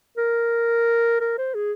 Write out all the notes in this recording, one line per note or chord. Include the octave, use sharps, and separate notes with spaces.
A#4
A#4
C5
G#4